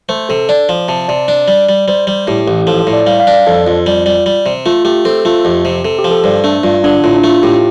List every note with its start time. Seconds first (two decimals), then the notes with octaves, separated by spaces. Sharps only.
0.09 A3 C5
0.29 C3 A4
0.49 D4 D5
0.69 F3
0.88 C3 A5
1.08 C3 D5
1.28 D4
1.48 G3
1.69 G3
1.88 G3 C5
2.07 G3
2.27 A2 G4
2.47 A1 G4
2.67 F3 A4
2.81 C5
2.87 A2
2.93 D5
3.07 G3 F5
3.20 F5
3.27 D4
3.33 D5
3.47 F2 A4
3.67 F2 F4
3.86 G3
4.06 G3
4.26 G3
4.46 C3
4.66 A3 F4
4.85 A3 G4
5.05 C4 A4
5.25 A3 F4
5.45 F2 G4
5.65 C3
5.85 C3 A4
5.98 G4
6.04 F3
6.11 A4
6.24 G2 C5
6.44 A3 D4
6.63 G2 F4
6.84 D3 D4
7.03 A2 F4
7.17 D4
7.24 A3
7.29 F4
7.43 A2 G4